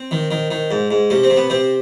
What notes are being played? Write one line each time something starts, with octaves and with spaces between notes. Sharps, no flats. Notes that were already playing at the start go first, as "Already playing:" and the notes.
Already playing: C4
D#3
D#3
D#3
G#2
G#2
C3 C#4
C4
C3
B3
C3 C4